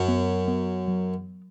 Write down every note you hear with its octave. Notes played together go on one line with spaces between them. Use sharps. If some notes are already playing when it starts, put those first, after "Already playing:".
Already playing: F#2 C#4
B3
B3
F#3